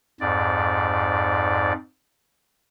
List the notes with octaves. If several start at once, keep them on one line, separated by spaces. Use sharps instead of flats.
F2 G#2 D5